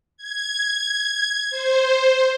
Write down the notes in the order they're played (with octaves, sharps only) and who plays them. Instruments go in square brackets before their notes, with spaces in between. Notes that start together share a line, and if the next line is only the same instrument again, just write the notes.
[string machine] G#6
C5